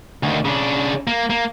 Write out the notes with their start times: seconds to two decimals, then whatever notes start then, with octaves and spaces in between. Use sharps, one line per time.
0.23 D2 D#3
0.45 C#3 D4
1.07 A#3
1.30 A#3